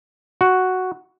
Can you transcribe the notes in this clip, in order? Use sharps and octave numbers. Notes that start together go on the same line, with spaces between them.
F#4